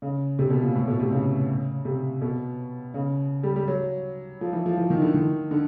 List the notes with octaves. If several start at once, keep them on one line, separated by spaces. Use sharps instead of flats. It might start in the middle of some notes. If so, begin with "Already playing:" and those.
C#3
C3
B2
A#2
A2
B2
C3
C#3
C3
B2
C#3
G3
G3
F#3
F3
E3
F3
E3
D#3
D3
D#3
D3